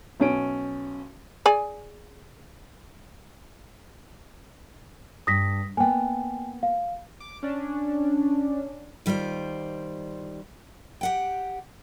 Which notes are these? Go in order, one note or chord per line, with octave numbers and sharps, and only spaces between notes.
B1 C#4 D7
G#4 D5 G#5
G2 D#6 A#6 B6
A#3 B3 G5 G#5
F5
D6
C#4 D4
D#3 G3 F4 C5 D5
G4 F#5 G5